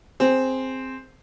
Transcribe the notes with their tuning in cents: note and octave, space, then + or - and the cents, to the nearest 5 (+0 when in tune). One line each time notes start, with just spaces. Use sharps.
C4 +0 G#4 +0